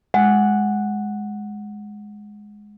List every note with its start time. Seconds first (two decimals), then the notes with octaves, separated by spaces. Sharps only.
0.14 G#3 F#5